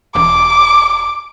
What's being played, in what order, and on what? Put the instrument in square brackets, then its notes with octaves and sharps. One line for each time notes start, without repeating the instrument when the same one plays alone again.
[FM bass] E1 [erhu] D6